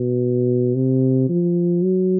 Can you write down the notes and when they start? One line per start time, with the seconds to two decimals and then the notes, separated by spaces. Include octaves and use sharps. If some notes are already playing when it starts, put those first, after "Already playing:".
Already playing: B2
0.75 C3
1.29 F3
1.82 F#3